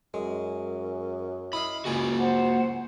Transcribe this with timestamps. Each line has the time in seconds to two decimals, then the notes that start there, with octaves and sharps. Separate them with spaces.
0.14 F#2 G#3
1.53 E4 D#5 F5 B5
1.85 C#2 A#3 F#4 G#5 A#5
2.18 C5 F#5